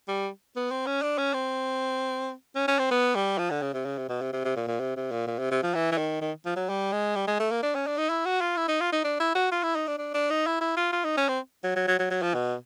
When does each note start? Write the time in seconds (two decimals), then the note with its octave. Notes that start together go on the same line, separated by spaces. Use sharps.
0.08 G3
0.56 B3
0.71 C4
0.87 C#4
1.02 D4
1.18 C#4
1.34 C4
2.56 C#4
2.68 C#4
2.79 C4
2.91 B3
3.15 G3
3.38 F3
3.51 D3
3.62 C#3
3.74 C3
3.86 C#3
3.98 C3
4.09 B2
4.22 C3
4.33 C3
4.45 C3
4.56 A#2
4.68 A#2
4.80 C3
4.96 C3
5.12 A#2
5.27 A#2
5.39 C3
5.51 C3
5.63 F3
5.75 E3
5.92 E3
5.98 D#3
6.21 D#3
6.46 F3
6.56 F#3
6.69 G3
6.92 G#3
7.16 G3
7.28 G#3
7.40 A3
7.51 A#3
7.63 D4
7.75 C#4
7.87 D4
7.98 D#4
8.10 E4
8.26 F#4
8.41 F4
8.57 E4
8.68 D#4
8.81 F4
8.93 D#4
9.04 D4
9.20 E4
9.35 F#4
9.52 F4
9.63 E4
9.76 D#4
9.88 D4
9.98 D4
10.14 D4
10.30 D#4
10.47 E4
10.61 E4
10.77 F4
10.93 F4
11.05 D#4
11.17 C#4
11.29 C4
11.64 F#3
11.76 F#3
11.88 F#3
11.99 F#3
12.10 F#3
12.22 F3
12.34 B2